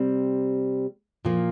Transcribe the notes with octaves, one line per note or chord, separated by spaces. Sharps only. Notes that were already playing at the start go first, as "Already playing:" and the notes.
Already playing: C3 G3 C4
A#2 F3 A#3